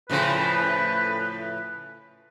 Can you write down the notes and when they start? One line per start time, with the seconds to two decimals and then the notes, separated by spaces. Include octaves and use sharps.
0.10 A2 C#3 F3 B4